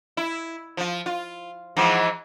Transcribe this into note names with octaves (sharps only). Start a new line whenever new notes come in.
E4
F3 F4
F4
G#2 E3 F3